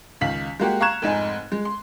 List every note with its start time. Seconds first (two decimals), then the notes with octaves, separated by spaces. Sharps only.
0.21 C#2 D#3 F5 B6 F#7
0.60 G#3 A#3 F#4 G4
0.81 F5 A#5 C#6 F#6 G#6 E7
1.02 F1 G#2 D#4 G#5
1.52 G#3
1.65 C6